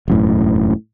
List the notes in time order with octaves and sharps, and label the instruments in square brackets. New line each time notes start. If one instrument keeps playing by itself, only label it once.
[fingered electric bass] E1 F#2 A2